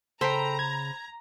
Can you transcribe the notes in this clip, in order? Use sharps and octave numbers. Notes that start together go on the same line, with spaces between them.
C#3 A4 C5 G5 A#5 B5
G#6